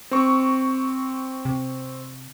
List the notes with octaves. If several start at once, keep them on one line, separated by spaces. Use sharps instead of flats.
C4 C#6
C3